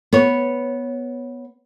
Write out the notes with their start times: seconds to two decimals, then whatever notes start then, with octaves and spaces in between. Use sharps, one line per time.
0.13 B3 C#5